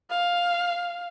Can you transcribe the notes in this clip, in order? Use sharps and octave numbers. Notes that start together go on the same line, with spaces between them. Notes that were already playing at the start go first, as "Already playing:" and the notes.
F5